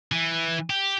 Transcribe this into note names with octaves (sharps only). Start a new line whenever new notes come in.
E3
G4